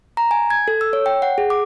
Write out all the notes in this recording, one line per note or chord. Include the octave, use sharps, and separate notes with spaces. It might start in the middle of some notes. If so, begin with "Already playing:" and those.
A#5
G#5
G#6
A4
E6
C#5
G5
F#5
G#4
D6